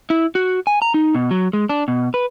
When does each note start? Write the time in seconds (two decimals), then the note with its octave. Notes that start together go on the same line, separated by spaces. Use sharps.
0.10 E4
0.35 F#4
0.67 G#5
0.82 A#5
0.94 D#4
1.15 B2
1.31 F#3
1.53 G#3
1.69 D4
1.88 B2
2.14 B4